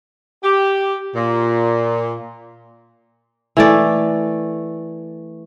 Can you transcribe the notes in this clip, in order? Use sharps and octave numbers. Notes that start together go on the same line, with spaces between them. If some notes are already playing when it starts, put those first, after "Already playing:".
G4
A#2
E3 A3 D5